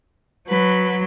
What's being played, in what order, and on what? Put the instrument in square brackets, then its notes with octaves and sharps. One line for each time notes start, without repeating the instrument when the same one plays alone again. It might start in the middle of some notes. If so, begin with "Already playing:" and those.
[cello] F#3 [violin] B4